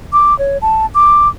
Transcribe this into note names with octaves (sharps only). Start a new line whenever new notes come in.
D6
C#5
A5
D6